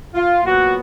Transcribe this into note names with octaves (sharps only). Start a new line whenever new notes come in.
F4
A#2 F#3 B3 F#4